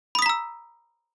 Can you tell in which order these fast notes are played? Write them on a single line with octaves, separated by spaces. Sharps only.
B5 D#6 B6 A#5 E6